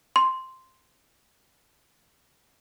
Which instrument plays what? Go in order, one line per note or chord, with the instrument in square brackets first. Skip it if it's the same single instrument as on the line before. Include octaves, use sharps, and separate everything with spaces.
[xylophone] C6